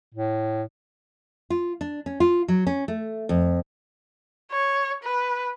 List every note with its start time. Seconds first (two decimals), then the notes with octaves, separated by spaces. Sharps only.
0.14 A2
1.50 F4
1.81 D4
2.06 C#4
2.20 F4
2.48 F#3
2.67 C#4
2.88 A3
3.29 F2
4.52 C#5
5.03 B4